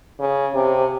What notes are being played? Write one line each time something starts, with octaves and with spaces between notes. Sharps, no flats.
C#3
C3